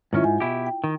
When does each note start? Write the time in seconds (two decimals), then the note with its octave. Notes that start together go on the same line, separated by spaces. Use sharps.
0.13 G#2 D#3 C#4 E4 F4 E5
0.24 G#2 G#5
0.40 B2 E4 G4
0.66 G5
0.84 D#3